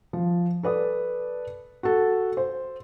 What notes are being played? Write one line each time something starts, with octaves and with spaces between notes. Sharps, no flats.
F3
A4 B4 D5 D#6
F#4 A4
C5